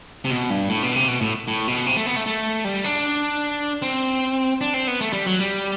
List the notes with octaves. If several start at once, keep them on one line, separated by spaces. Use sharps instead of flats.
C3
B2
G2
A2
B2
C3
B2
A2
A2
B2
C3
A3
B3
A3
A3
G3
D4
C4
D4
C4
B3
A3
G3
F#3
G3